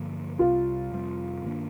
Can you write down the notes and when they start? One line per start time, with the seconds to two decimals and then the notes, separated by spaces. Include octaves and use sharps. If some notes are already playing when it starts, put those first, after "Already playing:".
Already playing: G2 D3 F3 A#3
0.39 C2 C3 G3 F4
0.92 F2 C3 G3 C4
1.44 G2 D#3 A#3 D4